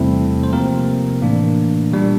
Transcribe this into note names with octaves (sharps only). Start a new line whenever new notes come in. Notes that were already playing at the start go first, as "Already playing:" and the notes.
Already playing: E2 C3 G3 A3 C4 E4 A4
C5
C3 F3 A#3 C4 A#4
A2 E3 A#3 D4
A#2 G3 D4